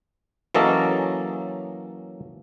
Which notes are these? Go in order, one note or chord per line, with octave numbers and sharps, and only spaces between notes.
E3 F#3 A#3 C#4 A4 D#5